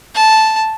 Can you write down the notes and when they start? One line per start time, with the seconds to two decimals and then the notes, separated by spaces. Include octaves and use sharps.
0.15 A5